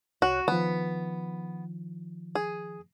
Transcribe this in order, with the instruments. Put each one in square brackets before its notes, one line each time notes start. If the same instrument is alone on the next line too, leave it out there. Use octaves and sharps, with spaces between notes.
[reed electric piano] C2 C#5 F#6 [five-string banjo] F#4
[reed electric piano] D#3 F3 [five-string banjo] B3
[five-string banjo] G#4